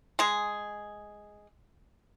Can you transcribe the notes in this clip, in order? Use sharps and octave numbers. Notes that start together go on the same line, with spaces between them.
G#3 G#4